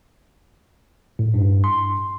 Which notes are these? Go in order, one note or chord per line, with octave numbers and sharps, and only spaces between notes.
A2
G2
C6